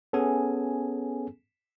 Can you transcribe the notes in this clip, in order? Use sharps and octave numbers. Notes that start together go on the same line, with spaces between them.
B3 C#4 G#4 A4 G#5